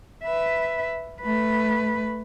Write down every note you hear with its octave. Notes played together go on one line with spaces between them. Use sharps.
B4 E5
A3 B4